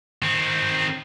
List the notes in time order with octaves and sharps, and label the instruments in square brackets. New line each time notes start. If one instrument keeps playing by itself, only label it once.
[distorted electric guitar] D#3 C4